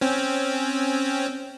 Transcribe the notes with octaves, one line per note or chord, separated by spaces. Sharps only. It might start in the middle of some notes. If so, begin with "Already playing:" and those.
C4 C#4